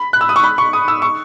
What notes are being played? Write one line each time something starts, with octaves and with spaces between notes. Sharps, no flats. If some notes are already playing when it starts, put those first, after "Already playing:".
Already playing: B5
F#6
E6
D#6
C#6
B5
C#6
D#6
E6
C#6